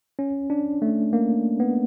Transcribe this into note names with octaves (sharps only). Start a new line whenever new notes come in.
C#4
D4
A3
A#3
B3